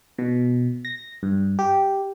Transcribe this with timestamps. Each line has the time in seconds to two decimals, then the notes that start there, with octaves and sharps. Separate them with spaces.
0.18 B2
0.85 A#6
1.23 G2
1.59 G4